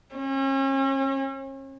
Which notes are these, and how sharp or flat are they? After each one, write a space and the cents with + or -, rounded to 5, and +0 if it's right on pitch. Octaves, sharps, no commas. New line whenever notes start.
C#4 -40